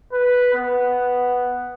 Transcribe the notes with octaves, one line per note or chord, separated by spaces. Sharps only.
B4
B3